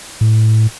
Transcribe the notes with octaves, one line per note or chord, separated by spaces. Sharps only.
A2